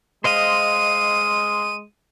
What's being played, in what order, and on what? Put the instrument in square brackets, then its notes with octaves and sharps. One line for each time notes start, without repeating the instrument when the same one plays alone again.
[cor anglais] G#3 [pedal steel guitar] C5 D#5 F5 [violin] D#7